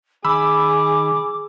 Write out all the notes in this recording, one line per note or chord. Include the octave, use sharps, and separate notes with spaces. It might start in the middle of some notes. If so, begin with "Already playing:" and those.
D#3 G#4 B5 D6 E6